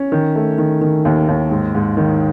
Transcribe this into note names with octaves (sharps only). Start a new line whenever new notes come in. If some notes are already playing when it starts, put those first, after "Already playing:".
Already playing: C#4
D#3
A3
D#3
D#3
D#2
D#2
G#2
G#2
D#3